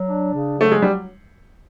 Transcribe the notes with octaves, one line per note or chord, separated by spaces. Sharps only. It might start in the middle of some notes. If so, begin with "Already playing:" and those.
Already playing: F#3
D4
C#3
F#3 A3
G#3
G3